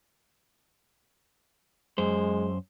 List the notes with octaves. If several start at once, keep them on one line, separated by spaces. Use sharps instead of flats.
F#2 G#3 C5